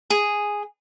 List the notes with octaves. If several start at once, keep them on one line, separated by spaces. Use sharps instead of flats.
G#4